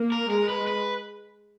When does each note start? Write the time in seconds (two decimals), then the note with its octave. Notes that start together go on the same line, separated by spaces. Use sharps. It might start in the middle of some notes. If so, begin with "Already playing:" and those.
Already playing: A#3
0.12 A#4
0.30 G#3 A#4
0.49 B4
0.67 B4